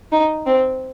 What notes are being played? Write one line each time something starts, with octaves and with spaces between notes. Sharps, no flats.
D#4
C4